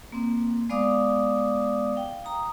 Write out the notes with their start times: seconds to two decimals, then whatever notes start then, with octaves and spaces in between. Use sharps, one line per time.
0.12 A#3 C4
0.70 G#3 B3 D5 F5 D6 D#6
1.95 F5 G5
2.25 A#5 D#6